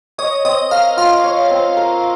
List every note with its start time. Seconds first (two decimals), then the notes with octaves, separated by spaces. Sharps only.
0.18 C#5 D#5
0.44 C4 D#5
0.71 A#4 F5
0.97 F4 F5
1.24 C#5
1.50 C4
1.77 A#4